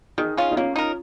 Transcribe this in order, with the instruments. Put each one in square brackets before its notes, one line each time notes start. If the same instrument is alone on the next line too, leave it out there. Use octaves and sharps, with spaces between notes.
[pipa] D#3 [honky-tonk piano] D#4 G#4
[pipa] C#4 F4
[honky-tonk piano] D#4
[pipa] A#3 [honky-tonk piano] C#4 F4
[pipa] D#4 A#4